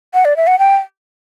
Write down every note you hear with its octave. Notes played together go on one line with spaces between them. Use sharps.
F#5
D5
E5
F#5
G5